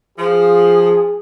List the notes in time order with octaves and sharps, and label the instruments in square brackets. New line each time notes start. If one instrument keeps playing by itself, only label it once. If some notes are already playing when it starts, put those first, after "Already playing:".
[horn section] F3 [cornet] G#4